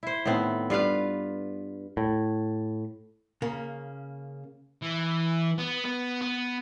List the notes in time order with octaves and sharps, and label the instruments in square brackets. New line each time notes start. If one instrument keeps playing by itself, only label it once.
[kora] E4 C5
A2 D#3 B3 C4
G2 F4 B4 F5
[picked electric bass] A2
[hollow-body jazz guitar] C#3 A#3
[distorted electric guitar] E3
B3
B3
B3